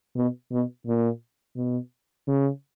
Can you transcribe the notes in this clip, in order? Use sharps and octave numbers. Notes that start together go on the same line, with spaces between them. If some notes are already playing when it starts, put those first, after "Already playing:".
B2
B2
A#2
B2
C#3